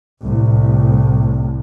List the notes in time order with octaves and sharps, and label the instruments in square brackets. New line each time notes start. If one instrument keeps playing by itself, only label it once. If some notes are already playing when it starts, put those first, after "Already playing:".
[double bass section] C2 A2